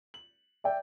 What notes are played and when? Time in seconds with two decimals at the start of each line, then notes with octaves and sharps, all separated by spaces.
0.14 F#7
0.64 D5 E5 G5